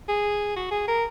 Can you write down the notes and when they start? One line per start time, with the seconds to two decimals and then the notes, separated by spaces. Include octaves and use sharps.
0.08 G#4
0.56 F#4
0.71 G#4
0.88 A#4